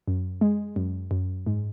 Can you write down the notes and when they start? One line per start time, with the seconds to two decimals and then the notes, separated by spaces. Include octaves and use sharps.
0.08 F#2
0.41 G#3
0.76 F#2
1.11 F#2
1.46 G#2